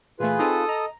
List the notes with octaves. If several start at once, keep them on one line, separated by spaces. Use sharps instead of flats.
A#2 E3 A3 F4 G#4 B4
C4 D#4 G4 A4 D#6
D#5 A#5